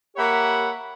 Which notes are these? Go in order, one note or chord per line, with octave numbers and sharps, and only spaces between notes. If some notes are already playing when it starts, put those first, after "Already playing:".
A#3 G4 C#5 E5 F#5 B5